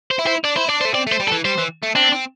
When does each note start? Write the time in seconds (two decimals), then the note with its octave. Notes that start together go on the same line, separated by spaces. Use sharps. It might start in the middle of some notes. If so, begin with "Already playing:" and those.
0.11 C5
0.19 E4
0.27 C5
0.44 D4 D5
0.56 E4 C5
0.68 D4 D5
0.81 C5
0.85 A3
0.94 C4 D5
1.07 A3
1.12 C5
1.20 G3
1.28 A4
1.32 E3
1.45 G3 C5
1.58 E3
1.83 A3
1.96 C4 D4
2.12 C4